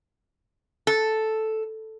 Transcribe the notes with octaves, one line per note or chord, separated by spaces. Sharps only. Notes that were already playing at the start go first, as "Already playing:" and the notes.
A4